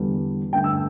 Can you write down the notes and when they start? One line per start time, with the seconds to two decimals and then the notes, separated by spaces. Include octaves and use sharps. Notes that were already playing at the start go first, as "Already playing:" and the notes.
Already playing: E2 D3 G3
0.53 G2 D3 A3 G5
0.64 E6